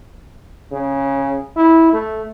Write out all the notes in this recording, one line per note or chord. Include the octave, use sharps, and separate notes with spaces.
C#3
E4
A3